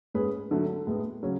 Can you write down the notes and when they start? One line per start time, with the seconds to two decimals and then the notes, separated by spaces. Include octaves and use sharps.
0.14 G#2 G#3 C#4 G#4 B4
0.51 D3 F#3 A3
0.87 A2 G#3 B3
1.23 C#3 F#3 C#4